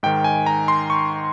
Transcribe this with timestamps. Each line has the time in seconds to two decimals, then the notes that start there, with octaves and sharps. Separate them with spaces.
0.03 G#2 D#3 G5
0.24 G#5
0.46 A#5
0.68 C6
0.90 C#6